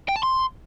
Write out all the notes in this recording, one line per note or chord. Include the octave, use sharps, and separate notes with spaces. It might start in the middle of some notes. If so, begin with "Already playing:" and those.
G5
A5
C6